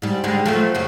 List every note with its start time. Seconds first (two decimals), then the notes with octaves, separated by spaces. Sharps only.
0.02 G#2 G3
0.24 D3 G3 G#3
0.46 F3 F#3 A3
0.75 F2 C#3 F#3